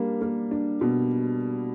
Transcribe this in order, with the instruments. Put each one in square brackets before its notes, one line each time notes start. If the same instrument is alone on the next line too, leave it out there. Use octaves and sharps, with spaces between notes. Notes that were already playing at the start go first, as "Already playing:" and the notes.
Already playing: [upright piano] G3 A#3 D4
A#3
D4
B2